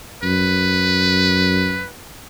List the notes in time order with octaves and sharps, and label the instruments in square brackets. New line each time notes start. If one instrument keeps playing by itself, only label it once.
[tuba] F#2 [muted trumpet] B4